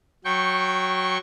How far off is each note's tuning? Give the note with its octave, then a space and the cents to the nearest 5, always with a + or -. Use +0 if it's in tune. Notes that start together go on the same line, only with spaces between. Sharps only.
F#3 +0 G5 -5 C#6 -20